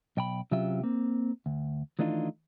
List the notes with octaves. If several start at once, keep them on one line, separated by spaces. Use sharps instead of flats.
B1 G5 B5
C3 F#3 C#4 F4 G4 E5
A#3 C4
D2
D#3 E3 A3 D4 D#4 F4